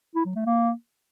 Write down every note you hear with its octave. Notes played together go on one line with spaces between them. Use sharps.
E4
F#3
A3
A#3